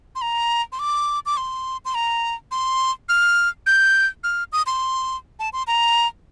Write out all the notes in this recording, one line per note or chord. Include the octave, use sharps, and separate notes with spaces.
C6
A#5
C6
D6
D6
C6
C6
A#5
C6
F6
G6
F6
D#6
C6
A5
C6
A#5